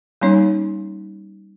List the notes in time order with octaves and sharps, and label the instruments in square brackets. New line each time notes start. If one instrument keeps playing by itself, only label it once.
[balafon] G3 A#3 C#4 D#4 C#5